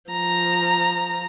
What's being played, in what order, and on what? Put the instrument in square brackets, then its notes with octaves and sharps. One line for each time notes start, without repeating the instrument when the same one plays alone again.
[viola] F3 A#5